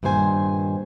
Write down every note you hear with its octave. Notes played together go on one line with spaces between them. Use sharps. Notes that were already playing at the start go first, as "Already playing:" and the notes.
G2 A#2 D#3 C5 G#5